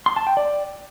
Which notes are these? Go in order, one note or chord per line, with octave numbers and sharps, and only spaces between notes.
C6
A5
G5
D5